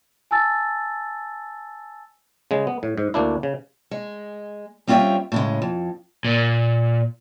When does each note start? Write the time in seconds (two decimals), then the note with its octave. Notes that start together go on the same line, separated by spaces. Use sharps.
0.31 G#5 A5 E6 A6
2.51 C#3 G#3
2.67 B3
2.83 A2
2.98 G#2
3.14 D2 A#3 D4 E4
3.43 C#3
3.91 G#3
4.87 G3 C4 C#4 F4 E5 G5
5.32 A2 C#3 G#3
5.62 F2
6.25 A#2